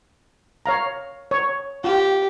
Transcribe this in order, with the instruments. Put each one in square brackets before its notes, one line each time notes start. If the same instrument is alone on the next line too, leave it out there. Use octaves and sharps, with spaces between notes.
[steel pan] C#5 F5 A#5
C#5
[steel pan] F4 [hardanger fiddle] G4